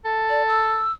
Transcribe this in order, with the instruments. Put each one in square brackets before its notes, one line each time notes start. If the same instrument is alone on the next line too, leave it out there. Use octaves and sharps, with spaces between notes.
[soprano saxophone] A4
[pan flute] D5
E6